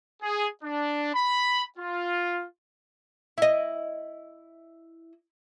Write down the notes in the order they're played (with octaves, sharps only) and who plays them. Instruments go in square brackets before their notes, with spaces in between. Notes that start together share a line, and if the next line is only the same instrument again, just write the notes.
[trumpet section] G#4
D4
B5
F4
[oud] E4 D#5